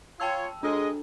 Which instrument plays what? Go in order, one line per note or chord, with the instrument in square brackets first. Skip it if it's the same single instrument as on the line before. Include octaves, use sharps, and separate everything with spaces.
[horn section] F4 C#5 [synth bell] G5 A5 E6
[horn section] G#3 D#5 [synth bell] D4 A4